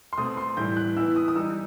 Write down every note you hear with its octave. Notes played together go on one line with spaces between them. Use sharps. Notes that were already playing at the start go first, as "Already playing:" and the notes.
C6
B2 A3 C4 D#6
C6
A2 E3 G3 G6
F#6
E3 B3 E4 E6
D#6
D#6
E3 G3 D#4 E6